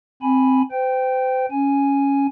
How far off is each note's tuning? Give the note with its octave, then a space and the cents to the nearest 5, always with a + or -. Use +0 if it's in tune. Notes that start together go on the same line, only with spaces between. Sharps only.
C4 +0 G#5 +0 B5 +0
C5 -35 G5 +0
C#4 +0 G#5 +0